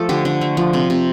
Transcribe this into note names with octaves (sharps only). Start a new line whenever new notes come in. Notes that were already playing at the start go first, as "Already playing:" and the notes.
Already playing: F3 A3 A4
D3 G4
D3
A3
F3
C3
C3